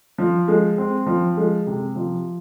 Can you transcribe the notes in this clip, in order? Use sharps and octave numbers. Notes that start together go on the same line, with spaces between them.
F3
G#3
C4
F3
G#3
C3
F3